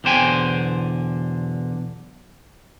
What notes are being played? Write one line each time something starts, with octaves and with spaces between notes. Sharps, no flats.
B1 E2 D3 C5 G5 G#5